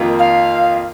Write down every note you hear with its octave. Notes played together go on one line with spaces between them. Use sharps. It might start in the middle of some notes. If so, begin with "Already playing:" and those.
Already playing: F2 D#3 A#3 F4
F5